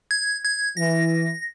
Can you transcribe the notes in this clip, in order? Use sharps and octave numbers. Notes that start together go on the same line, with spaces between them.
G#6
G#6
E3 A#6